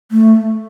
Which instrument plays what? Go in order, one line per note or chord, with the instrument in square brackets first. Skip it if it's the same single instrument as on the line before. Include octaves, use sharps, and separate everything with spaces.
[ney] A3